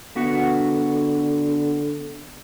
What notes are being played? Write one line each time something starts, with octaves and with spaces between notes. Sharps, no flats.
D3 B3 F#4 F#5